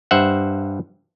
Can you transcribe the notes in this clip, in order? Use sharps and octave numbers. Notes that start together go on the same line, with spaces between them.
G2 C5 E5 F#5